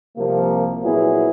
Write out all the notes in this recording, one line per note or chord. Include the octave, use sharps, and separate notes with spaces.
C2 C3 F3 A#3
A#2 F#3 B3 E4 G#4